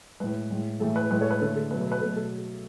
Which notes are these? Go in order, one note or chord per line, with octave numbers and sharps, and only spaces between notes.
A2 G#3 B4
A2 G#3
A2 E3 A3 A4
B4
A2 G#3 B4
A4 C#5
B4
D3 A3 A4
A4
B2 F#3 A3 B4
B4
B4
B2 F#3 A3 A4
A4